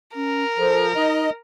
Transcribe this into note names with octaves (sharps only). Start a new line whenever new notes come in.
C#4 A#4
F3 A4
D#4 D#5